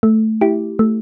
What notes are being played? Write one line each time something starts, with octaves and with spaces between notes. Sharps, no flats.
A3
E4 G4
A3